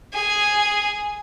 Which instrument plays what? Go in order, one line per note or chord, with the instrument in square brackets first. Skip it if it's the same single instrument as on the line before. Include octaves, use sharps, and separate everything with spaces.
[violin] G#4 G#5